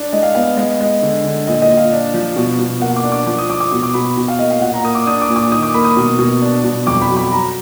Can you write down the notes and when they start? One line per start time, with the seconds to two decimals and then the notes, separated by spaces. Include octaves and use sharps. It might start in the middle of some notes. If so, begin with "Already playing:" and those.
Already playing: D4
0.13 G#3 D#5
0.23 F5
0.35 B3 F5
0.57 G#3
0.80 G#3
1.02 D3
1.24 D3
1.47 A#2 D#5
1.62 D#5
1.70 A#2
1.77 F5
1.92 D4
2.14 F3
2.36 B2
2.59 B2
2.81 A#3 F#5
2.96 D6
3.04 D4
3.12 D6
3.27 F3 D6
3.38 D#6
3.49 F3 D6
3.60 D6
3.71 B2 D#6
3.83 D6
3.94 B2 B5
4.17 B2
4.28 F5
4.39 A#3 D#5
4.51 F5
4.61 A#2 F#5
4.73 A#5
4.84 A#3 D#6
4.95 D6
5.06 D4 D#6
5.21 D6
5.29 A#2
5.36 D6
5.52 D#3 D#6
5.63 D6
5.74 A#3 B5
5.85 D#6
5.97 B2
6.19 B2
6.42 D4
6.64 B2
6.87 F2 D6
7.01 B5
7.08 F#3
7.16 B5
7.31 F#3 A#5